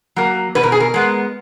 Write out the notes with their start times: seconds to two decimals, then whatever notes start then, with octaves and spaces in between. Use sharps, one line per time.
0.16 F#3 A#3
0.55 B2 B4
0.63 A#4
0.72 G#4
0.80 A#4
0.94 G#3 B3